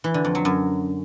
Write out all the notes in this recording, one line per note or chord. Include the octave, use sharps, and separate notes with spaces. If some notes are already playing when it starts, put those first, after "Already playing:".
E3
D3
F2
F#3
F#2